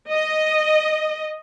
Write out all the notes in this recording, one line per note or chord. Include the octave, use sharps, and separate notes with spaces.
D#5